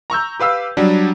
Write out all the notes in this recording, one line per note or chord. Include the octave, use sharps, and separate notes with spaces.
A#5 C#6 E6 G6
G4 B4 F5 E6
F#3 G3 D4